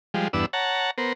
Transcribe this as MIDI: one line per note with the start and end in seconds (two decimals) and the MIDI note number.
0.14 0.28 53
0.14 0.28 55
0.14 0.28 56
0.33 0.46 40
0.33 0.46 43
0.33 0.46 59
0.33 0.46 62
0.33 0.46 88
0.53 0.91 73
0.53 0.91 78
0.53 0.91 81
0.53 0.91 82
0.98 1.13 59
0.98 1.13 70
0.98 1.13 72